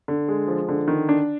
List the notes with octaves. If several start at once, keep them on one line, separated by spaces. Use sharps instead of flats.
D3
G#3
F3
D3
D#3
D4